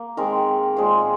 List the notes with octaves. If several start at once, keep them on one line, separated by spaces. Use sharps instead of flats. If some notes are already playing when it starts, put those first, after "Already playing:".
Already playing: A#3
D#3 G#3 C4 A#4
A#2 G#3 C4 C5